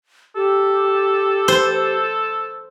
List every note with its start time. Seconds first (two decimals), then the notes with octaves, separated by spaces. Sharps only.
0.36 G4 A4
1.48 C5